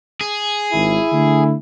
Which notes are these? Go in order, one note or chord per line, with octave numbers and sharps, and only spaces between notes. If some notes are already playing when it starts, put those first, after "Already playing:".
G#4
G#1 E4
D3 A3